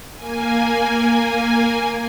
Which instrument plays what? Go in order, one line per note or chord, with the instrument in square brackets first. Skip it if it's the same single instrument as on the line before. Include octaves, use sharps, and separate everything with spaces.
[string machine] A#3 G#5